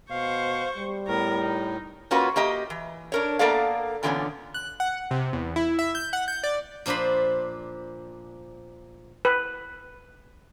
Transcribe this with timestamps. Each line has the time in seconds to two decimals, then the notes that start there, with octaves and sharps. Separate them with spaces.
0.10 B2 C5 F5 C#6
0.77 G3
1.08 A2 B3 A#4
1.40 D#4
2.11 A#3 C#4 F4 F#4 B4
2.36 A#3 G4 D#5
2.70 E3
3.12 D4 A#4 C#5
3.39 A#3 B3 A4 A#4 D5 F5
4.03 A#2 D3 E3 G#3 B3 C#4
4.54 F#6
4.80 F#5
5.11 C3
5.33 E2
5.56 E4
5.79 E5
5.95 G6
6.13 F#5
6.28 G6
6.44 D5
6.86 A#2 F3 D4 C5 B5
9.25 B4